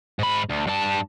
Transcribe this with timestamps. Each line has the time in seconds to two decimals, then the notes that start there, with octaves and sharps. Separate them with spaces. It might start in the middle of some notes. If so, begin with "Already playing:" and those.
0.19 G#2 B5
0.49 D2
0.67 G2 A5